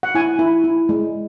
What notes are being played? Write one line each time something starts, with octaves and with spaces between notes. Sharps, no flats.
F#5
E4 G#5
E4
E4
G#3